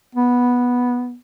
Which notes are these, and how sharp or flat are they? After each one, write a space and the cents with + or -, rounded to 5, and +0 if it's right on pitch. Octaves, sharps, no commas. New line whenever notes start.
B3 -10